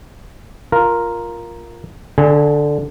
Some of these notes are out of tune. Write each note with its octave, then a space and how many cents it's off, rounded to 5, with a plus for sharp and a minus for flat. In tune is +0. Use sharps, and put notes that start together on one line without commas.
F4 +0 A#4 +0
D3 +0 G#4 +45 G#5 -25